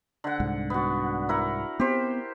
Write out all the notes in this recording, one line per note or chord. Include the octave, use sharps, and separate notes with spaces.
D3 F#5
C2 G#2
B3 F#4
E4 A#4 F#5
B3 C4 G4 C5